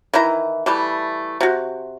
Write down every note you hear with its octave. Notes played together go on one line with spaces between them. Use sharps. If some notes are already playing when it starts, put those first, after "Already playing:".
D#3 E3 E4 A#5
E3 G3 A3
C3 F#4